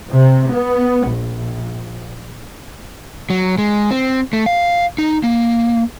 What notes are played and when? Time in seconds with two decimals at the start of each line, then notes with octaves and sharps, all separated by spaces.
0.11 C3
0.52 B3
1.10 A#1
3.30 F#3
3.58 G#3
3.91 C4
4.33 A3
4.46 F5
4.98 D#4
5.24 A#3